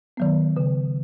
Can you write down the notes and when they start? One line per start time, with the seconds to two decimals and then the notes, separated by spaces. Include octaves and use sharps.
0.17 D#3 F#3 B3
0.56 C#3